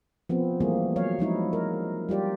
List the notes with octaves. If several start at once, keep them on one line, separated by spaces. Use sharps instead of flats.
F3 B3 C4
E3 G3 A3 A#3 G#4
F#3 C#5 F5
F3 G#3 D#4 E4
A#4
G3 F4 G4 D5